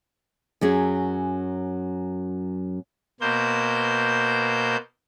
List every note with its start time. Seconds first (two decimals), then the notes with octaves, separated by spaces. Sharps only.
0.61 F#2 F#3 C#4 G#4
3.21 B2 A#3 C5 G6